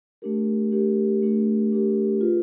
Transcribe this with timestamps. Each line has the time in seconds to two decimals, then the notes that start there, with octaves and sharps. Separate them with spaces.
0.22 A3 D4 G4 A#4
0.72 A3 D4 G4 A#4
1.22 A3 D4 G4 A#4
1.72 A3 D4 G4 A#4
2.21 F4 G#4 B4